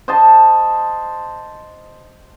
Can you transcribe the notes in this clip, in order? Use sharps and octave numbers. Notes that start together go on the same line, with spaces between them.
C5 D#5 A5